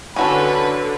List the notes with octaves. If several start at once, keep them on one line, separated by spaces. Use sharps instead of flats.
D3 C#4 F#4 A4 B4